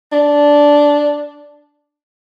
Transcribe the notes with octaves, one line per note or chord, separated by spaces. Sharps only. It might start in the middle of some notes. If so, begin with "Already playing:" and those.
D4